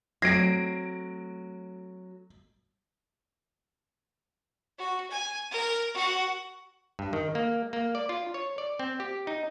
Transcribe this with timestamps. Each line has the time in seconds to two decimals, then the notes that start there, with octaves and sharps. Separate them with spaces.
0.22 F#3 A3 C4 G#6 A#6 C7 D7
4.78 F#4
5.10 G#5
5.51 A#4
5.94 F#4 F#5
6.99 G2
7.13 D#3
7.35 A#3
7.73 A#3
7.95 D5
8.09 F4
8.34 C#5
8.58 D5
8.79 C4
9.00 G4
9.27 D#4